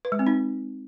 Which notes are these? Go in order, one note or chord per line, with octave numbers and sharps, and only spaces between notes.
B4
G#3
C4
D#4